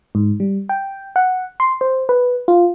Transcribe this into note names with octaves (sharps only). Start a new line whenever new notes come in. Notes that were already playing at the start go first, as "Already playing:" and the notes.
G#2
G3
G5
F#5
C6
C5
B4
F4